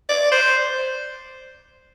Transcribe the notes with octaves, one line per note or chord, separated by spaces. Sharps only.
D5
C5